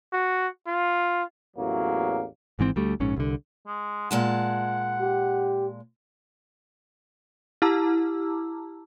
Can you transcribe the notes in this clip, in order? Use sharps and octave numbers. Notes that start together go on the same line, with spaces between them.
F#4
F4
A1 E2 F#3 A#3
G#1 G#2 E3 C4
D2 G3 A3
A#1 G#2 C#4
C2 D3
G#3
A#2 G#3 F#5 A5
G4
E4 G4 A5 A#5 D6 E6